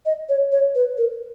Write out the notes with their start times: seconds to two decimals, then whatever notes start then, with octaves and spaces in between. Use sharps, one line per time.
0.06 D#5
0.29 C#5
0.52 C#5
0.75 B4
0.98 A#4